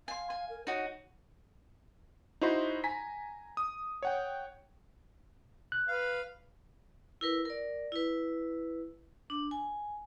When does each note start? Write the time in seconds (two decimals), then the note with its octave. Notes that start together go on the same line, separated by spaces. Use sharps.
0.08 F5 G#5 C6
0.30 G#5
0.49 A#4
0.67 D#4 F#4 C#5
2.41 D#4 E4 F#4 C5 C6
2.84 G#5 A#5 B6
3.57 D#6
4.03 C#5 F#5 G5
5.72 F#6
5.88 B4 F5
7.21 E4 A#4 B4
7.45 A#4 D5
7.92 E4 B4
9.30 D4
9.51 G#5